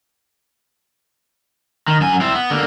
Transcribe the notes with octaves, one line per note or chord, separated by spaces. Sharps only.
D#3
F#2 G#5
C4 E4
B3
D3 A#3